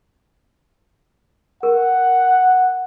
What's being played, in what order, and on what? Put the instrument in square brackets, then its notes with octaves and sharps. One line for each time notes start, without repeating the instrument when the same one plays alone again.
[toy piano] A#4 [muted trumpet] F#5